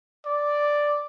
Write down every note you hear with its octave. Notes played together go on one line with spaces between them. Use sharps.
D5